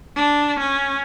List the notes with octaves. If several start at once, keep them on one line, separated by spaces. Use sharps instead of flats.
D4
C#4